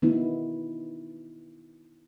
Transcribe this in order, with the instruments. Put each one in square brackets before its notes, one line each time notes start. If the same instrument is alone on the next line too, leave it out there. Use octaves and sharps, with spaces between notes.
[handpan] D#3 B3 D#4 E4